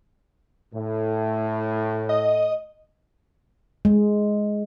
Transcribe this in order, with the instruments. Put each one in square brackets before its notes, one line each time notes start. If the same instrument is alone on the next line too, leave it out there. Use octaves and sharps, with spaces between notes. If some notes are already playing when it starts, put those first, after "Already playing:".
[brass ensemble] A2
[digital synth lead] D#5
[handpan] G#3